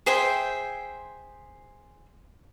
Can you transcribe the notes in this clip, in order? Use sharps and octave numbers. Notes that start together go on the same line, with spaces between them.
G#4 C5 E5 G5